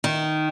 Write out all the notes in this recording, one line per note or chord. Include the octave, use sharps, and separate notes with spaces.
D#3